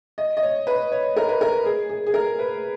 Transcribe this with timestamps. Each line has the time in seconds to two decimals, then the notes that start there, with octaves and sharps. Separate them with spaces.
0.18 D#5
0.37 D#5
0.43 C#5
0.67 B4
0.92 C#5
1.17 A#4
1.29 B4
1.41 A#4
1.65 G#4
1.89 G#4
2.07 G#4
2.14 A#4
2.39 B4